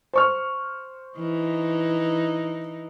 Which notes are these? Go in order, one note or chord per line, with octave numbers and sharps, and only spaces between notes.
C5 C#6 F6
E3 D#4